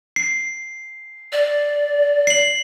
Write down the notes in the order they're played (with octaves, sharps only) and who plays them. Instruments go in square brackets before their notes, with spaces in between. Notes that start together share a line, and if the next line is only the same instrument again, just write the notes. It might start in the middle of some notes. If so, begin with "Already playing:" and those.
[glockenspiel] C7
[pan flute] D5
[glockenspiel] C7 F#7